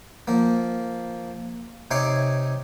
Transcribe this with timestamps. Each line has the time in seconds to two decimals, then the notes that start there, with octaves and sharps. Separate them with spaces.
0.28 F3 A#3
1.91 C3 D#4 C#5 G#5 C6 D6